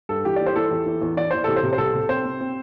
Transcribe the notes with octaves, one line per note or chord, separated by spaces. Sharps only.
G2 A4
E3 G4
D5
E3
C5
E3 A4
E2
E3
E2
E3 D5
E3 C5
C3 A4
C5
C3
C5
C2 A4
C3
C4 C5
C4
C4